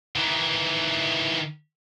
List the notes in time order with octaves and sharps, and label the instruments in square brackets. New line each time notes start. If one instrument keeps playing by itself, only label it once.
[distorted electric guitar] D#3 E3